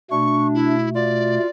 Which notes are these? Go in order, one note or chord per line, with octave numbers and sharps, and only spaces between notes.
B2 A3 D4 C#6
E4
F4 D5